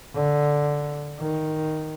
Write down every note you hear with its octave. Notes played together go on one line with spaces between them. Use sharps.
D3
D#3